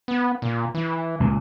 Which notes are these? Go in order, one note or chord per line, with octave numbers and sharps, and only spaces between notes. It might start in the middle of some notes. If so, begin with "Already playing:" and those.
B3
A#2
E3
C#2 A#2